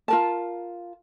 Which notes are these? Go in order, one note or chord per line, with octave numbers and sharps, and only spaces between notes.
F4 A#4 A5